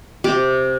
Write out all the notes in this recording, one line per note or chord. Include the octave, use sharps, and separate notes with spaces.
C3 G4